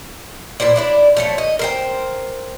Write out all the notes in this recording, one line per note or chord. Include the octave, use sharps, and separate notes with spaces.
A#2 E4 C5 D5
D4 E4 D5
F3 A3 C#5
D#5
A#4 C5 G5